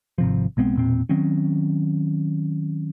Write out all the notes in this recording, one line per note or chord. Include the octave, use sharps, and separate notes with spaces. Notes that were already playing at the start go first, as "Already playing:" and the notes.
G#1 C3 F3
B1 G#3 B3 C4
E1 A#2 C4
D#3 F#3 C4 C#4